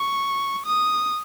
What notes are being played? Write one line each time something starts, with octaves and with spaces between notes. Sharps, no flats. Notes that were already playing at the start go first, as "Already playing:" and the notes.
Already playing: C#6
D#6